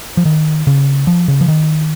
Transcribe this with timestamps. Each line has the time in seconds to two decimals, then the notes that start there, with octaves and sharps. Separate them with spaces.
0.17 F3
0.25 D#3
0.67 C#3
1.07 F3
1.28 C#3
1.41 F3
1.48 D#3